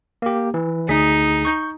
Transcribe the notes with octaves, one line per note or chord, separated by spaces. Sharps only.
A#3 G4
E3
D2 D#4 G#4 B6
C#6 G6